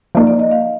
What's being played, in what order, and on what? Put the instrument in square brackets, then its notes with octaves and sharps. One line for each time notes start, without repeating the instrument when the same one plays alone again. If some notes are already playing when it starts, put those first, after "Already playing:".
[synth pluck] F3 A#3 D#4 [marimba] D5
[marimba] D5
D#5
F5